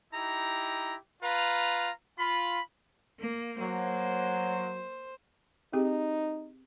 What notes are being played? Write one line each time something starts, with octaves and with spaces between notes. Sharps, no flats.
D#4 E4 G4 A#5
F4 B4 F5 A#5
F4 B5
A#3
F#3 A#3 C5
C4 D#4 G4 G#4